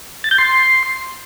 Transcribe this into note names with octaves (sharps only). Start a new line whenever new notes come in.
A6
G6
C6